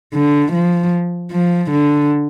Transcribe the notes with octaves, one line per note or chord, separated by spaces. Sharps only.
D3
F3
F3
D3